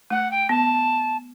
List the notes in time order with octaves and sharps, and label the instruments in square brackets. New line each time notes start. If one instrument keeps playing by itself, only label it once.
[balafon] A3 [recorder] F#5
[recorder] G5
[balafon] B3 [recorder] A5